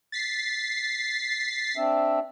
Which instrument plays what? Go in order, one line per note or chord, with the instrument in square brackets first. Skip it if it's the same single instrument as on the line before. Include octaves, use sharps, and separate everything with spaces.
[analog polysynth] A6 B6 C7
[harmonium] C4 D4 E5